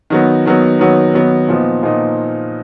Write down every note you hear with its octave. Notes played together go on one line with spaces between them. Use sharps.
D#3 F#3 B3
D#3 F#3 B3
D#3 F#3 B3
D#3 F#3 B3
A#2 F3 B3 D#4
A#2 F3 B3 D#4